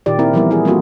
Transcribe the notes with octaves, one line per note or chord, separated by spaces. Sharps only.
A#2 D#3 G4 D5
C4 E4 A#4
E3 F3 G3 B3 E4 A#4
E4 G#4
G3 A#3 C4 F4 F#4 A4